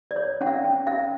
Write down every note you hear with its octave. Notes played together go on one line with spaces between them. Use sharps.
D5
C#5
C#4 F#5
F5
C#4
C#4 F5